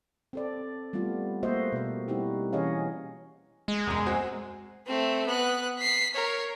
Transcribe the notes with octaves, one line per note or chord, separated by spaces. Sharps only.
C4 A4 D5
G3 A3 B3 F4
A3 A#3 F#4 C5 D#5 E5
B2 C5
G3 C4 D#4 E4 F#4 G4
E3 C#4 G#4 C#5 D#5 F5
G#3
E1 F#2 A#5
C4 F#4 G#4
A3 C4
B3 F#6
B6 C7
A#4 C#5